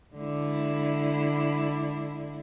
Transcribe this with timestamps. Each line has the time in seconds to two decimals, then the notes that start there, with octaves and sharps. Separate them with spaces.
0.17 D3 G#3 E4